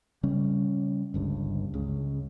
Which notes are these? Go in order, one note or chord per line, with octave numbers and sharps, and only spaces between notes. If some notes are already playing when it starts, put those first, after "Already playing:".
C#3 G3 C#4
G1 C#2 G2
C#2 C#3